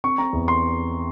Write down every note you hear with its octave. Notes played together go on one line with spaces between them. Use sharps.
C4 C#6
C4 A#5
E2
C6